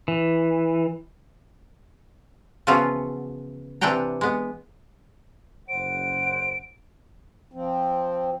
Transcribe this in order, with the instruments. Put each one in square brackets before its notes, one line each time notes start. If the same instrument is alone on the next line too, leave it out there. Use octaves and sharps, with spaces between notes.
[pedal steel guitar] E3
[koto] C#3 E3 F3 B3 F4 F#4
C3 E3 D4 F#5 G5 A#5
G#3 B3
[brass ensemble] F#1 C5 F#5 [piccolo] D7
[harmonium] F3 C4